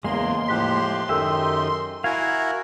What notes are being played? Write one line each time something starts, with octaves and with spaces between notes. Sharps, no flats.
E2 C#3 G#3 A#3 C6
A2 F3 G4 F#6 B6
F#2 D#3 G4 A4 A#4 E5 E6
E4 F#4 A#4 F5 G#5 G#6